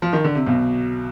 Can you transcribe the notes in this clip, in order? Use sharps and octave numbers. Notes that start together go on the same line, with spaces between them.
F3
D#3
D3
C3
B1 B2